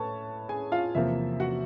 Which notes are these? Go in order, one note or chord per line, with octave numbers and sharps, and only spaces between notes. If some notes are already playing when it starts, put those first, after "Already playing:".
Already playing: A2 A4 B4 C#5 A5 C#6
G#4 G#5
F4 F5
E2 C3 F3 A#3 E5
F#4 F#5